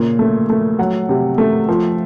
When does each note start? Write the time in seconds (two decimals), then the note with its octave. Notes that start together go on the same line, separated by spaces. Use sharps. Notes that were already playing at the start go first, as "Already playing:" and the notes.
Already playing: A#2 C#3
0.19 A3
0.49 A3
0.79 F#3 F#5
1.09 C3
1.38 A3
1.69 F3